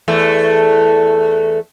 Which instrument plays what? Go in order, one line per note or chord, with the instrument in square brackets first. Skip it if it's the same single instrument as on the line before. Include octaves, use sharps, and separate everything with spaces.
[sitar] E2 A3